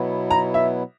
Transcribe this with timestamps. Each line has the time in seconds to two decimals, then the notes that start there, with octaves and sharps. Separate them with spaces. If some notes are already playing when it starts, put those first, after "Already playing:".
Already playing: B2 F#3 B3 E4
0.31 A#5
0.54 E5